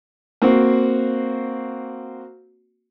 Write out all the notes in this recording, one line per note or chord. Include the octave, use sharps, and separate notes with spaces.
A#3 C4 F#4